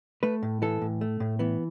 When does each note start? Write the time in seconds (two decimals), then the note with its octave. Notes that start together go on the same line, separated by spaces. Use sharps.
0.23 A3 B4
0.43 A2
0.62 E3 A4
0.82 A2
1.01 A3
1.20 A2
1.39 E3 B3